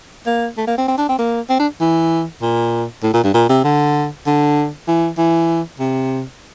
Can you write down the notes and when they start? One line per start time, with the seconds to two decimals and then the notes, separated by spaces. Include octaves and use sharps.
0.26 A#3
0.57 A3
0.67 A#3
0.78 C4
0.88 C4
0.98 D4
1.09 C4
1.19 A#3
1.50 C4
1.60 D4
1.81 E3
2.42 A#2
3.03 A2
3.13 A#2
3.24 G2
3.34 A#2
3.49 C3
3.64 D3
4.27 D3
4.88 E3
5.18 E3
5.80 C3